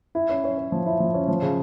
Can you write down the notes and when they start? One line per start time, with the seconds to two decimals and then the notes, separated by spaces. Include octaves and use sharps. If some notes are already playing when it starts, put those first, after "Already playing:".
0.15 E4
0.29 C#4
0.44 C#4
0.57 C#4
0.72 F3
0.86 E4
1.00 F3
1.14 C#4
1.28 F3
1.42 C#3